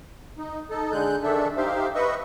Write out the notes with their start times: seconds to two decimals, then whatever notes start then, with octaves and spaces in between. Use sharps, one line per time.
0.38 D#4
0.70 D#4 A4
0.92 D3 G#3 F#6 G6
1.23 D#3 D4 A4 E5
1.57 D#4 G4 C5 E5 F5
1.95 B4 D#5 E5 C#6